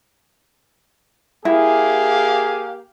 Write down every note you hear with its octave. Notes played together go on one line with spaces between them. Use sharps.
A#3 E4 G4 G#4 F5